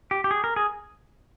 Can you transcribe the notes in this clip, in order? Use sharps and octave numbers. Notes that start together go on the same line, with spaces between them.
G4
G4
G#4
A#4
G#4